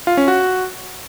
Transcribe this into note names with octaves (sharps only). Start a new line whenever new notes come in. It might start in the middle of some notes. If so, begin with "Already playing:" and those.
F4
C#4
F#4